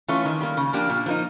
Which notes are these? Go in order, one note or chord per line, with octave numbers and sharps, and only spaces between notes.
E3 A3 C#4 F4
D#3
G3 A#3
C#3
F3 A#3 D4 G4
A#2
F3 A#3 D#4